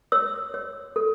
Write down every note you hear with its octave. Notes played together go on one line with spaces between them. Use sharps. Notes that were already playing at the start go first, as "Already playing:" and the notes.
C#5 E6
C#5
A4